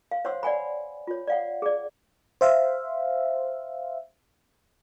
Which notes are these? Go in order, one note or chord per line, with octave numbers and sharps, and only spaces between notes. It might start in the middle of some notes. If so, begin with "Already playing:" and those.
F5
C5 C#5 F#5 C6 E6
D5 F#5 G#5 B5
F4 C#5
D5 F5 F#5
G#4 D5
C5 E5 F5